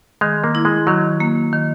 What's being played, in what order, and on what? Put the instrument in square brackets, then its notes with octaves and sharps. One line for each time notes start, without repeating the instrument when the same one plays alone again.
[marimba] D#3 [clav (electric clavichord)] G#3
[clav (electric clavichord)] A#3
[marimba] E4
[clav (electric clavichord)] G#3
[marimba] D#3 [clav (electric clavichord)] F#3
[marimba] A#3
D#3